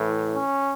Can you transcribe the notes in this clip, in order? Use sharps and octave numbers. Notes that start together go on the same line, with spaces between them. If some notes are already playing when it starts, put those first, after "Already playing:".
Already playing: A2 E3
C#4